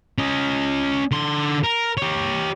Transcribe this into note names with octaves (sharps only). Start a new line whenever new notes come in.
C#4 D#5
D3 C6
A#4
G4 C#5